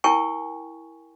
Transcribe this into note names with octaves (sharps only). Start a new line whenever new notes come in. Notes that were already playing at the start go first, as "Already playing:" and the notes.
E4 A#4 G5 G#5 C#6